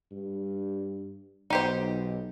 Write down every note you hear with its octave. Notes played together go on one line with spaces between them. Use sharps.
G2
B1 D#4 G4 C5